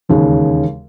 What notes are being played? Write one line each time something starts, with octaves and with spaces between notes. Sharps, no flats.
E1 D#2 C#3 G#4